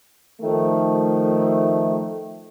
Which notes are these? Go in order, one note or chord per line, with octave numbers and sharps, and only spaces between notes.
D#3 F3 A3